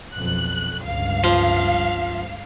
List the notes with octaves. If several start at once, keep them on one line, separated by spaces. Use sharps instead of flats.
B1 F2 F#6
G1 C#2 G2 F5
F3